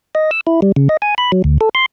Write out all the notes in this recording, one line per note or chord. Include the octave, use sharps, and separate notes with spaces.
D#5
E6
E4
G3
C#3
D#5
G#5
B5
F#3
D2
A4
C6